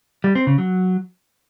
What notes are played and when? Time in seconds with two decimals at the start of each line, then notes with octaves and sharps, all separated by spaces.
0.24 G3
0.35 C4
0.47 C#3
0.58 F#3